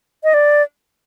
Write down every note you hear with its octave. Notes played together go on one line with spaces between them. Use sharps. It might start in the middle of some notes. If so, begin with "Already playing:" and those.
D#5
D5